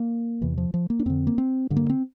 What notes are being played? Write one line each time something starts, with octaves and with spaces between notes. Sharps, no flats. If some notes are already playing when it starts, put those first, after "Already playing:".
Already playing: A#3
E2 C3 E3
F3
F3
A#3
D4
F2 D3 C4
A#3
C4
G2 D3
A#3
C4